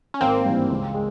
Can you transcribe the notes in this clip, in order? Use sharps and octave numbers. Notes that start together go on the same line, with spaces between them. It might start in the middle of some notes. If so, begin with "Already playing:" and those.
C#4
G#1 A#3 C4
G2 E3
C#2
G#3